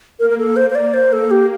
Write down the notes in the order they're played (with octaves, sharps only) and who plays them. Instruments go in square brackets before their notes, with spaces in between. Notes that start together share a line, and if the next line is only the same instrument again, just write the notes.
[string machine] A#3 [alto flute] A#4
[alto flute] A#4
A4
C5
C5
D5
C5
A4
G4